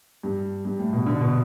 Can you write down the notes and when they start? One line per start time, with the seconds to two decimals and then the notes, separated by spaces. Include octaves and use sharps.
0.23 G2
0.65 G2
0.79 A2
0.93 B2
1.06 D3
1.20 B2